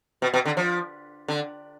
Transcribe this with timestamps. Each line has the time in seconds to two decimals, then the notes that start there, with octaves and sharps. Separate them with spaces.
0.22 B2
0.34 B2
0.45 D3
0.57 F3
1.28 D3